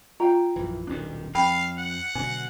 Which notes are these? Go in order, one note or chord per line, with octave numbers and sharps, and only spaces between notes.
F4 F5 G5 A#5
A#1 F#2 E3
D#1 B1 D#3 D4
F2 F5 G5 B5
F#5
B2 D3 F#3 G#5